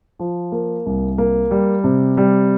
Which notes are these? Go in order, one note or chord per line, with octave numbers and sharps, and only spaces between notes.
F3
A#3
C2
A#3
G3
C3
G3